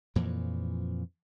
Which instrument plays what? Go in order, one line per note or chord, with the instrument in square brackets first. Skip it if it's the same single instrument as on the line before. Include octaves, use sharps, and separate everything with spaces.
[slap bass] F2 A#2 E3 F3